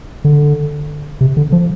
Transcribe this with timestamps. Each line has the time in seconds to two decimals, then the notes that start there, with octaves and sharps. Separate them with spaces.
0.25 D3
1.21 C3
1.37 D3
1.52 F3